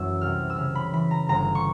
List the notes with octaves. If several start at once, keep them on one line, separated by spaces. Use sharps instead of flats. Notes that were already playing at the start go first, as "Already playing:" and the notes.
Already playing: F#2 E3 F#3 E6
C2 F6
E6
C#3 F6
B5
E3 B5
A#5
G1 A#5
C#6